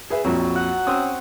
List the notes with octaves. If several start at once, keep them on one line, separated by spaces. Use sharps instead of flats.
G#4 B4 E5
A#1 F2 F#3
F#5
C4 C#4 D#6